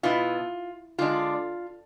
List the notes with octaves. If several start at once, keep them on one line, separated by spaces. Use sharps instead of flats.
B2 B3 E4 F4
D3 G#3 D4 F4